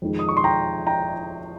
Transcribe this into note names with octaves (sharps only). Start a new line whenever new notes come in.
F2 D#3 G#3
D#6
C#6
C6
G5 A#5
G5 A#5